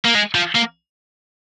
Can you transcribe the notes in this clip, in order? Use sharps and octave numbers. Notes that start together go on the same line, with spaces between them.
A#3
G#3
F3
A#3